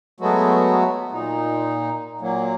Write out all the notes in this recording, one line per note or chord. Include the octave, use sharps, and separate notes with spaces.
F#3 G#3 A3 B3 F#4
A#2 D#4
A#2 F#3 A#3